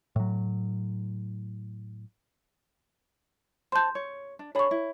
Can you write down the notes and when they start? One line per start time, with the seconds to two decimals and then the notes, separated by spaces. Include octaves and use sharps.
0.16 A2 F#3
3.72 C5 A5 C6 G6
3.95 C#5
4.39 D4
4.55 D4 G#4 C#5 B5 C#6
4.71 E4